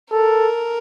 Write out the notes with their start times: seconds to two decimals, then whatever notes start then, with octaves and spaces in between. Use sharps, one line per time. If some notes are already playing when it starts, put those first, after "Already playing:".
0.11 A4 A#4